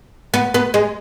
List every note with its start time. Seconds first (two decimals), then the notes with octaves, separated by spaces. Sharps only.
0.34 B3
0.54 B3
0.74 G#3